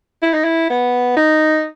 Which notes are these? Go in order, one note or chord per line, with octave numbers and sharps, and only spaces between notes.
E4
D#4
E4
B3
D#4